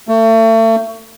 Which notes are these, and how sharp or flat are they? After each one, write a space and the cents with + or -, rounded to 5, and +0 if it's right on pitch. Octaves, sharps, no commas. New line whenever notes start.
A3 +35